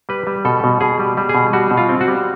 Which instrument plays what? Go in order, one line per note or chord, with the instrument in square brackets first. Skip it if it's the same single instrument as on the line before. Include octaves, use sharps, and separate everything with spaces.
[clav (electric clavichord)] G3 B4
G3
B2 A4
B2
B2 G#4
G3
G3
G#4
B2
G3 F#4
B2
F4
C4
F#4
G3